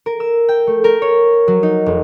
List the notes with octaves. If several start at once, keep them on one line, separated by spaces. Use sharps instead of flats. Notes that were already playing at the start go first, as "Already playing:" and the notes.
A#4
E6
G5
A3
A#4
C#5
F#3
D#4
F1